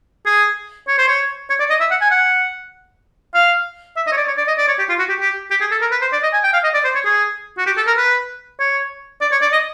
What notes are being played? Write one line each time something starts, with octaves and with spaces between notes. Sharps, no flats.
G#4
C#5
C5
C#5
C#5
D5
D#5
E5
F#5
G#5
F#5
F5
E5
D#5
C#5
D5
C#5
D5
D#5
D5
C#5
G4
F4
F#4
G4
G4
G4
G#4
A4
A#4
B4
C5
D5
D#5
G#5
G5
F5
D#5
D5
C5
C#5
G#4
F#4
G4
A4
A#4
B4
C#5
D5
C#5
D5
D#5